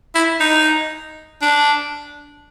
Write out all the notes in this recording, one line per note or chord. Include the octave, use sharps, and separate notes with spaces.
E4
D#4
D4